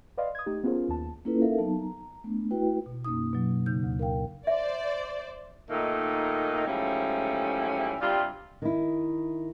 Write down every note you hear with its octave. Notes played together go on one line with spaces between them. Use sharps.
B4 D5 D#5 F5 C6
D#6 G#6
A3 D#4 G4
B3 C#4 F4 G#4 A#4 C5
D#2 B3 A5
A#3 C#4 E4 F4 A4 B4
D#4 A4 A#4 E5 F5
F#3 B3 D#4 A5
A#5
A3 B3 D4
A3 E4 F#4 B4 G5
B2
F#2 A#3 C#4 D#4 D#6
B2 F#3
C#3 D#4 G6
D2
A#4 F5 G5
C5 D5 E5
A#2 D#3 A3 A#3 D#4
G#2 E3 F3 G3 A3 C#4
G2 C3 G3 F4
D#3 E4